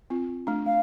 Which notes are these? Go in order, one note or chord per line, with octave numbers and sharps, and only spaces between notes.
C4 F4
A3 D4
A3 F5